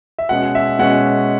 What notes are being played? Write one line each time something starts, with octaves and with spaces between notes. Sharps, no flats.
E5
B2 G#3 C#4 F#5
E5
B2 G#3 C#4 F#5